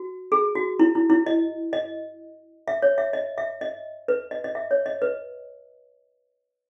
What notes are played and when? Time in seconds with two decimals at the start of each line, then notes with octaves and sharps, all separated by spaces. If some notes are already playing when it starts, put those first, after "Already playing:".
Already playing: F#4
0.32 G#4
0.55 F#4
0.79 E4
0.95 E4
1.10 E4
1.26 D#5
1.73 D#5
2.68 E5
2.82 C#5
2.98 E5
3.13 D#5
3.38 E5
3.61 D#5
4.08 B4
4.31 D#5
4.44 D#5
4.55 E5
4.71 C#5
4.86 D#5
5.02 B4